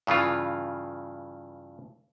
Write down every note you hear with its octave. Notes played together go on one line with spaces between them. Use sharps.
G2 C#3 E3 F4